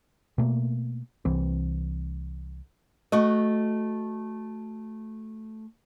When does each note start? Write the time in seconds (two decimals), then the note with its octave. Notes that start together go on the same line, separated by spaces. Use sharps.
0.38 B2 A3 A#3
1.25 C2 E3 C4
3.12 A3 F#4 D#5